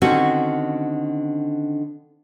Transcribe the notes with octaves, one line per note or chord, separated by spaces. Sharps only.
D3 D#3 C4 C#4 F#4